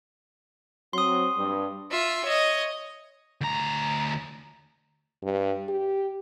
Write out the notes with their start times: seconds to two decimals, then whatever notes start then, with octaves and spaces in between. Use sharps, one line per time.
0.93 F#3 C4 C6 D#6
1.36 G2
1.91 F4 E5
2.25 C#5 D#5
3.41 D2 A#5
5.23 G2
5.68 G4